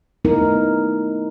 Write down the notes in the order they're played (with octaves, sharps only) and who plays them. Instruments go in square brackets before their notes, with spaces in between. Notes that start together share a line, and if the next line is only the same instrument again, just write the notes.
[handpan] A3 B3 D#4 E4 A#4